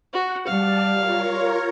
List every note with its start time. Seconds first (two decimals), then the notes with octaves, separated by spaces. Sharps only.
0.13 F#4 F#5
0.47 G3 D5 F5 A5
0.91 F4 A#4 C#5